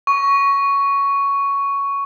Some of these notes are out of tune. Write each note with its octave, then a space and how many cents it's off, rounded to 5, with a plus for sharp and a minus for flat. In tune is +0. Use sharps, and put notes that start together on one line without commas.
C#6 +10